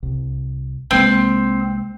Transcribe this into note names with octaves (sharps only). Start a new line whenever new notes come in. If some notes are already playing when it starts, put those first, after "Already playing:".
C2
C2 G#3 A#3 C4